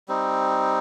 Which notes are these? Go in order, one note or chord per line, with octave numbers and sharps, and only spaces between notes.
G3 C4 D#4